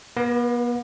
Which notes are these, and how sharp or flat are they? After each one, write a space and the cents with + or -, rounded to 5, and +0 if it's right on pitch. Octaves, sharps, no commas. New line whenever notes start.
B3 -45 B4 +0